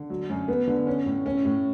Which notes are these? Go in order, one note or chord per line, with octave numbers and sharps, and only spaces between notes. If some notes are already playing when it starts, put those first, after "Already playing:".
Already playing: D3
F#3
F#2
B3
D3
C#4
A2
C#4
A2